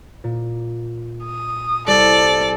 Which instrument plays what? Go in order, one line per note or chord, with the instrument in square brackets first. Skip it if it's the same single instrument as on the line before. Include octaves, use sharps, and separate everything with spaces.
[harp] A#2
[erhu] D#6
[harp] C2 E6 [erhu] A4 [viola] D5